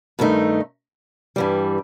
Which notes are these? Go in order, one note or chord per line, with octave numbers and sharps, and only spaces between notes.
G2 D#3 A3 D#4
G2 E3 G3